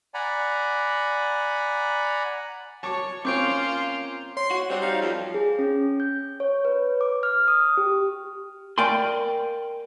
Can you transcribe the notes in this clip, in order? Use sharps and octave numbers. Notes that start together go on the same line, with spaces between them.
D5 F#5 G#5 A#5 B5
C#5 A5 C#6 D6
A#3 C4 C#4 F4 C#6 D6 G6 D7
C#5 C6
F#4
G3 C4 D4 F#4 C5
D#4 F5
F2 F3
G#4
C#4
G6
C#5
B4
D6
F6
D#6
G4
A#4 D5 F5 G5 G#5 C6